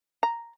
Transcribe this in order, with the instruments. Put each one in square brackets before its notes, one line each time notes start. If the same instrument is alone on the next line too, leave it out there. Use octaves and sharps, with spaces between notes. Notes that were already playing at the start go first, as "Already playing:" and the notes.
[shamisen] A#5